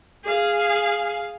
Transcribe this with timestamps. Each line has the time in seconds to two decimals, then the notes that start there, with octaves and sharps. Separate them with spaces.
0.24 G#4 F5